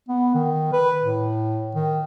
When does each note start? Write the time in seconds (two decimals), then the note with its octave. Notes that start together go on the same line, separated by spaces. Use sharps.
0.09 B3
0.34 D#3
0.73 B4
1.02 A2
1.75 D#3